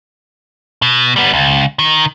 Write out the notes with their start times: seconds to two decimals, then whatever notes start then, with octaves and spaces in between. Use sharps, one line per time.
0.82 B2
1.16 G3 B3
1.33 C#2
1.79 D#3